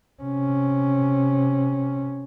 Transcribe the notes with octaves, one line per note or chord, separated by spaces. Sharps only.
C3 C#4